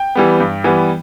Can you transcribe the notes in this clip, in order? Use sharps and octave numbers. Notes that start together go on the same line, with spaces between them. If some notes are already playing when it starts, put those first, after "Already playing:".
Already playing: G5
E3 G3 B3
G2
E3 G3 B3